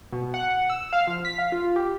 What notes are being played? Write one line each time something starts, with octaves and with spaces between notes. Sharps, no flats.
B2
F#5
E6
F5
F3
B6
F5
F4
G4